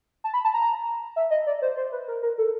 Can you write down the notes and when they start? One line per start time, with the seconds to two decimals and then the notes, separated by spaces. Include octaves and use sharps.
0.24 A5
0.34 B5
0.45 A5
0.54 A#5
1.16 E5
1.31 D#5
1.47 D5
1.62 C5
1.77 C5
1.92 B4
2.08 A#4
2.23 A#4
2.38 A4